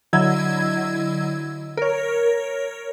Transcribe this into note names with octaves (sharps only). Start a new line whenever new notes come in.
D3 F#3 E4 D#5 E6 G#6
A#4 C#5